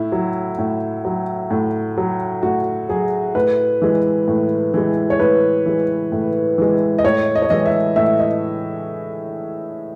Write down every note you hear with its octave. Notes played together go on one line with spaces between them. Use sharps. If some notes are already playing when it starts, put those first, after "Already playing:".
Already playing: A2 E4
F#3
A2
F#3
A2
F#3
A2 F#4
F#3 G#4
A2 B4
E3 G#3
A2
E3 G#3
C#5
A2 B4
E3 G#3
A2
E3 G#3
D#5
A2 C#5
D#5
C#5
E3 G#3 D#5
E5
A2 E5
D#5